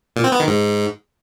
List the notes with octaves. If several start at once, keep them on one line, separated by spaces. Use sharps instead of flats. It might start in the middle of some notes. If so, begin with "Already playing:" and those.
A#2
C4
B3
D#3
G#2